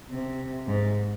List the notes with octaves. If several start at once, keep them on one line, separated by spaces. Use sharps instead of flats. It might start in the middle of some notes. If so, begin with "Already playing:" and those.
C3
G#2